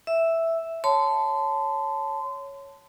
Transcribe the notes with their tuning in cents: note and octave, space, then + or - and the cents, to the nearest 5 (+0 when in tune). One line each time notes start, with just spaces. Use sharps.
E5 +0 E6 +0
C#5 +0 A5 -5 C6 -30